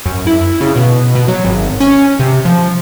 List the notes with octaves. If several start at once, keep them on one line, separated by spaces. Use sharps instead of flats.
F#2
E4
C#3
B2
B2
F#3
G#1
C#4
C3
F3